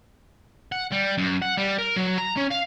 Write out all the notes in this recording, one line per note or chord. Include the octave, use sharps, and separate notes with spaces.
F#5
G3
F#2
F#5
G3
A#4
F#3
A#5
C#4
F5